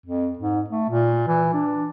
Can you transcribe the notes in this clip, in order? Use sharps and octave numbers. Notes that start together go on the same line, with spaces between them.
F2
G#2
A3
A#2
E3
D4